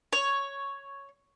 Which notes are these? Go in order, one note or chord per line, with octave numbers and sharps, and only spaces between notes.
C#5